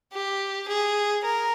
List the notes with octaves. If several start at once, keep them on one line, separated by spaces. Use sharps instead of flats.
G4
G#4
A#4